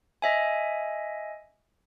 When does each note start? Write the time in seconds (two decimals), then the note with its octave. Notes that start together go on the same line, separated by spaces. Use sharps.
0.22 D#5 E5 G#5